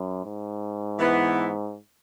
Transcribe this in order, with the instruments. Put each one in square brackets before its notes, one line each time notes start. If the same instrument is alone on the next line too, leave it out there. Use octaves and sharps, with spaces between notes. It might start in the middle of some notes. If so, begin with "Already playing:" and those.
Already playing: [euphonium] F#2
G#2
[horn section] E3 B3 E4